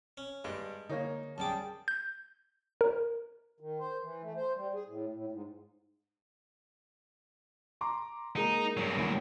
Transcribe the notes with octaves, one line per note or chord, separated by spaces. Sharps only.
C#4
G2 G3 G#3
D3 A#3 D#4 A#4 C#5
F#2 G3 G4 G#4 A5 D6
G6
A#4
D#3
C5
E3
A3
C5
G3
G#4
A2
A2
G#2
A#5 C6 D6
G#3 A#3 D#4 G#4
G2 F#3
D#2 A2 F#5